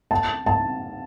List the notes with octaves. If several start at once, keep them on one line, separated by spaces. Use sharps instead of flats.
A5
A5